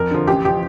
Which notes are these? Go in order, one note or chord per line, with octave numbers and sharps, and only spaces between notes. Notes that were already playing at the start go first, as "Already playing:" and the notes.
Already playing: F2 A#4
D3 F3
A1 G4
F3 G4